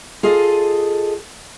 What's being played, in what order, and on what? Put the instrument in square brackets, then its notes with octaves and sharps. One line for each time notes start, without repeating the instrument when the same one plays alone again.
[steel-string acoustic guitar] F4 G#4 A4 D#5